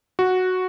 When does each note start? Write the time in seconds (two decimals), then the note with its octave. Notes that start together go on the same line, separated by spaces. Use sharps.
0.19 F#4